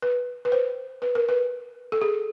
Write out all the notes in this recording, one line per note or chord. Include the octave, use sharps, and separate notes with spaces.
B4
B4
C5
B4
A#4
B4
A4
G#4